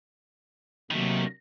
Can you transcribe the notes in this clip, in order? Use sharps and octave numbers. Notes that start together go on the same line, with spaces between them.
C3 D#3 F#3 A3 A#3